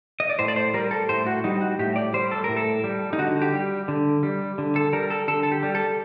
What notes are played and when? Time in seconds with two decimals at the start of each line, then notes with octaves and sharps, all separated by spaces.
0.20 D#5
0.30 D5
0.39 A2 C5
0.48 D5
0.56 C5
0.74 G3 A#4
0.91 A4
1.09 A2 C5
1.26 F#4
1.44 G3 D#4
1.61 F#4
1.79 A2 G4
1.96 D5
2.14 G3 C5
2.31 A4
2.44 A2 A#4
2.57 A4
2.84 G3
3.13 D#4
3.19 D3 F#4
3.42 G4
3.53 G3
3.88 D3
4.23 G3
4.58 D3
4.76 A4
4.93 G3 A#4
5.10 A4
5.28 D3 A4
5.43 A4
5.52 G4
5.63 G3
5.75 A4